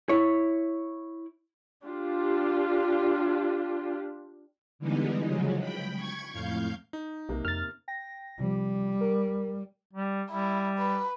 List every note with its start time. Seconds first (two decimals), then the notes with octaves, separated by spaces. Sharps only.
0.09 E4 C#5
1.84 D4 F4 G4
4.79 D3 E3 G3 G#3 B3 D#4
5.25 C#3 F3 F#3 G#3
5.60 G5 B5
5.96 C#6 G#6
6.32 F2 A2 F5 G6
6.93 D#4
7.29 B1 C3 A#3
7.45 F2 F6 A6
7.88 G5 A#6
8.40 C3 F3 G3
9.01 A#4
9.94 G3
10.30 G3 E4
10.79 B4